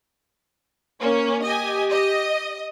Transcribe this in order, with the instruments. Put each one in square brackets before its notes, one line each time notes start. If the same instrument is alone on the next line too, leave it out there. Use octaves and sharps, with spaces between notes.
[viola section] A#3 [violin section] C#4
[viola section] G4 [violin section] D#5 G#5
[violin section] D#5